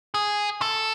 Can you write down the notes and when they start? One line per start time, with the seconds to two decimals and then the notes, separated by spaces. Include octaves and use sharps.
0.14 G#4
0.62 A4